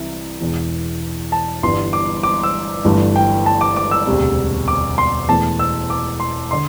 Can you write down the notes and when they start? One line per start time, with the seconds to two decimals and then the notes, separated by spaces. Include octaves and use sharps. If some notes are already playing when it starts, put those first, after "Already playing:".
Already playing: C2 C3 E3 E5
0.41 E1 E2 E3
1.32 A5
1.63 G1 G2 E3 C6
1.93 D6
2.23 D6
2.43 E6
2.85 G1 G2 E3 A3
3.16 G5
3.46 A5
3.61 D6
3.76 D6
3.91 E6
4.07 E1 D2 C3 G3
4.68 D6
4.98 C6
5.28 E1 E2 E3 A3 A5
5.59 E6
5.90 D6
6.20 C6
6.51 D3 C6